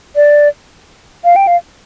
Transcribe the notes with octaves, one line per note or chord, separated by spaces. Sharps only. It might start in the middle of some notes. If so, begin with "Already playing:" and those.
D5
F5
G5
F5